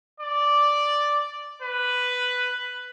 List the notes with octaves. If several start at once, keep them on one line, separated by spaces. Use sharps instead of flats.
D5
B4